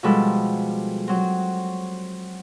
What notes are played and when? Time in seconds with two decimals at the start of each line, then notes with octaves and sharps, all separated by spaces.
0.03 B2 F3 G3 G#3 A4 B5
1.08 F#3 C4